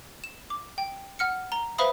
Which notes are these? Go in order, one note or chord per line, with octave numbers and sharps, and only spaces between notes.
E7
D6
G5
F#5 F6 C#7
A#5 G7
B4 C5 E5 F5 B5 D#6